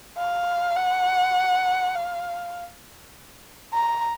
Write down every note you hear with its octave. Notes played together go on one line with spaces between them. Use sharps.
F5
F#5
F5
A#5